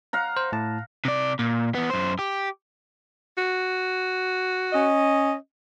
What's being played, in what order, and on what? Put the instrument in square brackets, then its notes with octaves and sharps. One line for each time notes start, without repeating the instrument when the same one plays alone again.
[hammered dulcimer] F5 F#5 A#5
[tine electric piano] C5
A2 A5
[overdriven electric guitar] C3 D5
A#2
E2 B3
F#2 C5
G4
[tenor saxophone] F#4
[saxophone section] C#4 D#5